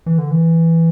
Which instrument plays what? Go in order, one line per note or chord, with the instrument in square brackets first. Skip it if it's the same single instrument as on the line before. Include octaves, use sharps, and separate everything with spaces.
[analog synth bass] E3
D3
E3